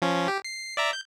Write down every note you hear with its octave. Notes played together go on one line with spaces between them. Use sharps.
F3 C#4
G4
C7
D5 E5 A#5
G6